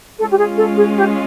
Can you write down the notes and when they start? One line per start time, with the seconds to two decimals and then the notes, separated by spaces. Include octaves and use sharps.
0.18 G#3 C#4 F4 A4
0.31 G4
0.38 G#4
0.57 A4
0.77 G#4
0.97 G4